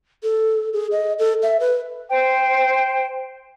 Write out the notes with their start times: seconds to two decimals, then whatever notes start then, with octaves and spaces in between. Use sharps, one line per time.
0.23 A4
0.73 G#4
0.92 D#5
1.19 A4
1.42 E5
1.60 B4
2.10 C5 G5